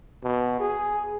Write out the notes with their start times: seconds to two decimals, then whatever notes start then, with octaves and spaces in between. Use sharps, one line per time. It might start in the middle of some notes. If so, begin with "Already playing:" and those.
0.24 B2
0.60 G#4